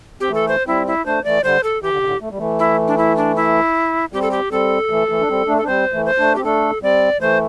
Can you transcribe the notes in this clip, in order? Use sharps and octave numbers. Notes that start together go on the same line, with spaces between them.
C4 G4
E3 A3
A4
C5
G3 C4 E4
E4
A3 D4 C5
E3 A3 D5
D3 G3 C5
A4
E3 G4
D3
C3
A2 D3
A3
G3
E3 A3
E4
D4
E4
D4
E4
G3 C4 G4
A4
G4
G3 C4 A4
E3 A3
E3 A3
D4
G3 C4
A3 D4
D4 A4
G3 C4 C5
E3 A3
C5
A3 D4
C4 G4
A3 D4 A4
G3 C4 D5
E3 A3 C5